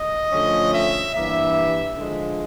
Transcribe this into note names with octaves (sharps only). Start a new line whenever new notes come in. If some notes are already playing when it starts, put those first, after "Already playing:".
Already playing: D#5
D3 F3 A3 C#4
E5
G2 E3 G3 A#3 E5
D3 F3 G#3